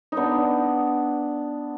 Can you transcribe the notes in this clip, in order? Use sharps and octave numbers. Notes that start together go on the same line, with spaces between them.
B3 D4 D#4